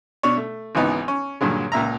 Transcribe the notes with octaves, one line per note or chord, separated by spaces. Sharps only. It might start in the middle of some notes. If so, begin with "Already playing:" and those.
B2 D4 C#5
A3
G#1 C#2 E3 B3 D#4
C#4
G2 A#2 D3 F#3 G#3
C#2 A#2 E5 A#5